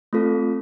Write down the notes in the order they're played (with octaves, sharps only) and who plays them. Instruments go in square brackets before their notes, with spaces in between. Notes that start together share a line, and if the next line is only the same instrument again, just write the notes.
[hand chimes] A3 C4 F4 A4